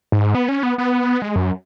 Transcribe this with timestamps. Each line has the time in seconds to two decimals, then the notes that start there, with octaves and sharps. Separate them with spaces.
0.12 G#2
0.35 B3
0.49 C#4
0.63 B3
0.78 B3
1.22 G#3
1.36 F#2